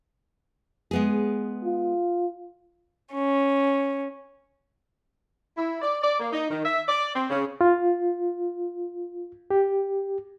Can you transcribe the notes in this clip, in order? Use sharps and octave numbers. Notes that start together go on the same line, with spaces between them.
G#3 B3 G#4
F4
C#4
E4
D5
D5
A#3
D#4
D#3
E5
D5
C4
C#3
F4
G4